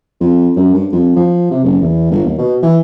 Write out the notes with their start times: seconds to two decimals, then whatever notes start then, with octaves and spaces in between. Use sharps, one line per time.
0.21 F2
0.56 F#2
0.74 G2
0.92 F2
1.16 F3
1.51 C3
1.64 F#1
1.81 E2
2.11 G1
2.26 D#2
2.38 B2
2.63 E3